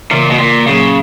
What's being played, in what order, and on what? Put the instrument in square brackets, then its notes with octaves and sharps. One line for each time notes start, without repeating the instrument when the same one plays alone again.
[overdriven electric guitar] A#2 [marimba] C#3 E3 A#3
[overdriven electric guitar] B2
A#2
[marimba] A#2 F#3 A#3 [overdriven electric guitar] C#3